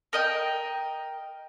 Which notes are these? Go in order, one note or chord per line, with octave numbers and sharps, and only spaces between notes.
A#4 D#5 G5